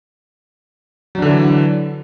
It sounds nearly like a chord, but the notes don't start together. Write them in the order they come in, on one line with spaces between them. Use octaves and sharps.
F#3 D4 D3 E3